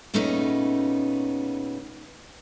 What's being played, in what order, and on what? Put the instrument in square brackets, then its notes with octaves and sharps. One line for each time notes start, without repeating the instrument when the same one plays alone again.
[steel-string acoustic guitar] A#2 C#3 A3 B3 C#4 D#4